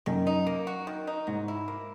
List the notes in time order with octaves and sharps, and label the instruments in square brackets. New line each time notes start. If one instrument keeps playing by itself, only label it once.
[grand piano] F#2 [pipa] D#3
[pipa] D#4
A#3
F#4
D#3
D#4
[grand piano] G#2 [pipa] F#3
[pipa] E4
A#3